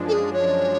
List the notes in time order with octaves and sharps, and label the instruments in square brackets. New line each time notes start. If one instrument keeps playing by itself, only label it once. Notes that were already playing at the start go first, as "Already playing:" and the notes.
Already playing: [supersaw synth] F#2 F3 G#3 D4
[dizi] A4
G#4
C#5